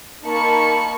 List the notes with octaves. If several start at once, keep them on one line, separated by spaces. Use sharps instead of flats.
A#3 D#4 A5 B5 C#6 C#7